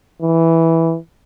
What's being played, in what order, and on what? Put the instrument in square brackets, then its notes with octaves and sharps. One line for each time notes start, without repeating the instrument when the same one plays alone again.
[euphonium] E3